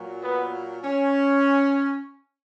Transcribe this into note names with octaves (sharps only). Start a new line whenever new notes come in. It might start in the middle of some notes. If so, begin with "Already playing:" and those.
Already playing: A#2 F#3
B3
C#4